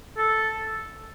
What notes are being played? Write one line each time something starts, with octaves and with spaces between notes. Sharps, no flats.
A4